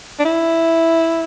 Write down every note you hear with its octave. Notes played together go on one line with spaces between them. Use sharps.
D4
E4